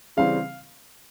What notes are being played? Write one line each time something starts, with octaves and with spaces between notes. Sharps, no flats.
C#3 E3 G3 C4 F5